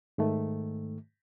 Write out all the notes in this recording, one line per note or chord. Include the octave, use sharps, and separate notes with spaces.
G#2 D#3 A3